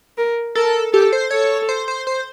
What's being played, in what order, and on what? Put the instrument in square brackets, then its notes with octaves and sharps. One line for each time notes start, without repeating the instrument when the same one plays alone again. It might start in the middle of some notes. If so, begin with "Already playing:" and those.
[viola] A#4
[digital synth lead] A4 [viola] A#4
[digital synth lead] G4 [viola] A4
[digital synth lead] C5
[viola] A4 [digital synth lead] C#5
[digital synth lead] C5
C5
C5